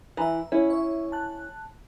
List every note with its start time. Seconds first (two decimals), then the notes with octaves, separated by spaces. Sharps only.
0.17 E3 E5 A#5
0.52 C#4 E4
0.70 C#5 E5
1.12 A5 F#6